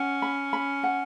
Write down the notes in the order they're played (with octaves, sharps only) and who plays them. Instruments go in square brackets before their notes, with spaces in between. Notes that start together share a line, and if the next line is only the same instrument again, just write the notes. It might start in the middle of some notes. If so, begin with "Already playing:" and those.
Already playing: [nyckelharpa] C#4 [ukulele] F#5
[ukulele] B5
B5
F#5